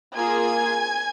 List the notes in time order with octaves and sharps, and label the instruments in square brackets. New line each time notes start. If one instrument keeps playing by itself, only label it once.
[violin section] A#3 F4 G#4 G#5 G#6